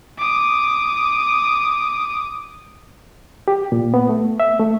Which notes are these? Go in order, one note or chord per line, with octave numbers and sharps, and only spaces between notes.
D6 D#6
G4
A#2
B3
A3
E5
A3